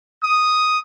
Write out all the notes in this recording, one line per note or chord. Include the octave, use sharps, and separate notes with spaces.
D#6